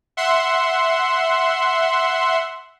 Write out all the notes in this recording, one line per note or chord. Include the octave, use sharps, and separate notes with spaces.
E5 F#5 C6